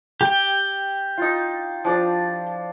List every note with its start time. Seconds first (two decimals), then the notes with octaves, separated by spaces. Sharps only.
0.21 G4 G5
1.18 D#4 F4
1.84 F3 D4 D5